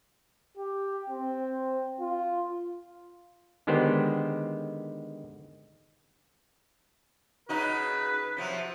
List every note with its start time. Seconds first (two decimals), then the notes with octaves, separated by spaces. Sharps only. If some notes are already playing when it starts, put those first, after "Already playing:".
0.57 G4
1.10 C4
2.01 F4
3.67 D3 D#3 G#3 B3 G4 C5
7.49 C#3 D#4 F#4 B4
8.37 C3 F3 F#3